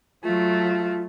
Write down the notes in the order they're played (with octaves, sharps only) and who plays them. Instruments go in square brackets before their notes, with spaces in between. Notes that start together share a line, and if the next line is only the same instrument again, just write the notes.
[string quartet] F#3 A3 [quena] F4